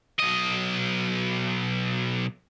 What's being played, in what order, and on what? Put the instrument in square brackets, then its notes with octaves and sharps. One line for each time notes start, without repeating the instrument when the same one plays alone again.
[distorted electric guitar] B1 D#5